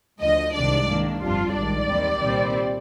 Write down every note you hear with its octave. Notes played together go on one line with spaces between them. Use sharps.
D2 D3 F3 D#5
C2 C3 D#3 G#3 D4 D5
G#2 D#3 A#3 D4
G1 F2 C3 G3 D4 F4
A#1 G#2 D#3 D5
D#2 D#3 G3 C4
C2 A#2 G3 C4